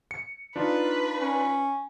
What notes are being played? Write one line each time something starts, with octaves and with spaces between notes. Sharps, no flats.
C#7
D4 D#4 F4 B4
C#4